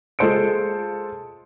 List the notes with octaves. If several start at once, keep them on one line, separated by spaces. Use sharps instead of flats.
G#3 F4 A4 C5 C#7 D7